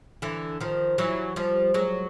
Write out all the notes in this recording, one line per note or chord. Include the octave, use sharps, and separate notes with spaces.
D3 E3
D#3 F3
E3 F#3
F3 G3
F#3 G#3